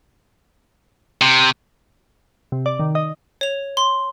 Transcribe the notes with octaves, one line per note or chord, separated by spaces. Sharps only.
C3
C3
D5
D#3
D#5
C#5 F7
C6